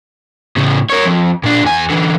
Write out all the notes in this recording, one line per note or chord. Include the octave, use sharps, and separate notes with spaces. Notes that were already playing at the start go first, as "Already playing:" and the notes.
A2 C#3
A#4 C#5
F2
A#2 D4
E2 G#5
D3 E3